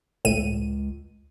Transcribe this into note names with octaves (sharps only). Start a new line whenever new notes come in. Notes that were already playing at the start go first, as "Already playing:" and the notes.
G1 C#2 A2 D#7